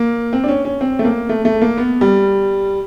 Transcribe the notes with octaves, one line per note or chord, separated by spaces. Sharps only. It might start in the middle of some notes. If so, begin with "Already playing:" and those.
Already playing: A#3
C4
D4
C#4
C#4
C4
A3
A#3
A3
A3
A#3
B3
G3